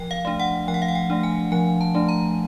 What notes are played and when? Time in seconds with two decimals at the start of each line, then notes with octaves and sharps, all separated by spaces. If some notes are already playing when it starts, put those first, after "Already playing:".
Already playing: F3 G5
0.11 F5
0.25 A3 D4
0.40 F#5
0.67 F3 G5
0.74 F#5
0.82 F5
0.88 F#5
0.95 G5
1.10 A3 D4
1.23 G#5
1.52 F3 G#5
1.81 A5
1.95 A3 D4
2.09 A#5